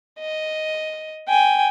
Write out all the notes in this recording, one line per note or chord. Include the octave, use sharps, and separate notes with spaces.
D#5
G5 G#5